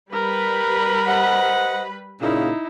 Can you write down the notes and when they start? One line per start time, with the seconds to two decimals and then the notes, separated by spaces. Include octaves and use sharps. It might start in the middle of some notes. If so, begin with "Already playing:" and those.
0.13 G3 A#4 B4 B5
1.07 C5 D#5 F#5
2.21 A#2 C#3 D#4 E4